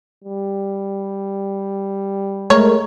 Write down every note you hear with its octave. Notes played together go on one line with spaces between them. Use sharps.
G3
G#3 A3 A#4 C#5